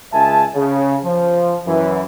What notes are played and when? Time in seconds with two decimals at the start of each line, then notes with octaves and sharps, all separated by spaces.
0.13 C#2 C#3 G#3 E5 G#5 A5
0.55 C#3
1.04 F3
1.66 F#2 E3